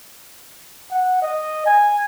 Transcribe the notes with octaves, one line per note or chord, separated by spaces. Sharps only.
F#5
D#5
G#5